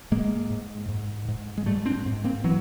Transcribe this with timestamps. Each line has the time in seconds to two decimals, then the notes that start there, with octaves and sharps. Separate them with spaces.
0.11 G#2 G#3 A#3
0.50 G#2
0.89 G#2
1.28 G#2
1.57 G#3
1.66 G#2 G3 A3
1.86 C4 D4
2.06 G#2
2.24 A#3 C4
2.44 E3 F#3